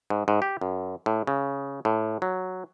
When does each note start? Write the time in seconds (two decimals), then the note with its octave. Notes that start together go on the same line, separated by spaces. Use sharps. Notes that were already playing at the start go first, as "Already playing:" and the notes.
0.10 G#2
0.28 G#2
0.42 G4
0.61 F#2
1.06 A2
1.27 C#3
1.85 A2
2.22 F#3